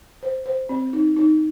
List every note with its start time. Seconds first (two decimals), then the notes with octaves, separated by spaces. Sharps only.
0.23 C5
0.46 C5
0.69 C4
0.93 D#4
1.17 D#4